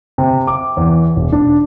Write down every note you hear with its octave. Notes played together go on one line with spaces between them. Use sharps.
C3
D6
E2
E1
D4